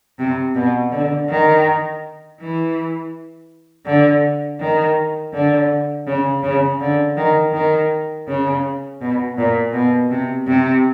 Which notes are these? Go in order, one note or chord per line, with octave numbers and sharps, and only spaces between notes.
C3
B2
D3
D#3
E3
D3
D#3
D3
C#3
C#3
D3
D#3
D#3
C#3
B2
A#2
B2
C3
C3